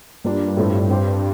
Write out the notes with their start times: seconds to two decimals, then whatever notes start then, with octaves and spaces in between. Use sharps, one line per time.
0.24 G2 G3 A#3 D4 F4
0.57 A2 A3 C4 F4 A4
0.90 C4 G4 C5